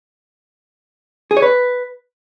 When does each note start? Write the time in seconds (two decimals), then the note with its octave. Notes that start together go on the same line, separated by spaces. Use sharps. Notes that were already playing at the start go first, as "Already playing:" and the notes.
1.31 G#4
1.37 C#5
1.42 B4